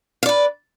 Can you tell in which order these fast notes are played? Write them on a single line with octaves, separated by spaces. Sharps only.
F5 D5 B4